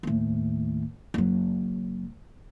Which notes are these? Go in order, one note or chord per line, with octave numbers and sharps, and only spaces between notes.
D#2 A2
F#1 F#3